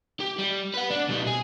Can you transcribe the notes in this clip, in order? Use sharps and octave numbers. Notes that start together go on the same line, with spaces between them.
G4
G3
B4 F#5
D4
B2 G3
G#4